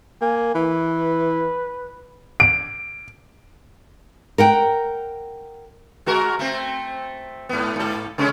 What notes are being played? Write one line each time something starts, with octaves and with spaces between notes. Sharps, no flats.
A#3 G#5
E3 B4
D7
A#4 F#5 G5
G#3 F#4 A#4
A3 C4
G#2 B3
G#2 A4
C#3 G#3 C#4